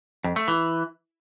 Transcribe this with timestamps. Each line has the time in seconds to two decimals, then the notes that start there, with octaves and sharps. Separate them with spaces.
0.24 F2
0.36 A3
0.48 E3